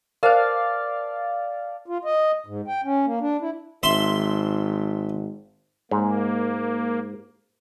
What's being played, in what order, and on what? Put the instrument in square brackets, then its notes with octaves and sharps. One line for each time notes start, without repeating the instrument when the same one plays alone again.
[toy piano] A#4 C5 [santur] D5 F5 A5
[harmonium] F4
D#5
G#2
G5
C#4
A#3
D4
E4
[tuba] G#1 [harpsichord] E5 C6
[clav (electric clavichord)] G#2 [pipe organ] A#3